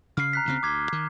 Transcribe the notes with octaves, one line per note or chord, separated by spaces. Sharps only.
C#3 F6 C7
A#5 F#6 B6
D2 C#3 C4
D2 D6 G#6 B6
D#3